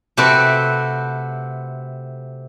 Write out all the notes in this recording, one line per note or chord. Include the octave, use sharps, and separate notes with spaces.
C3 A3 C4 F#4 B4